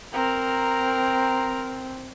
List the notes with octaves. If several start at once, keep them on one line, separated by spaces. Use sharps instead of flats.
C4 A#4 A#5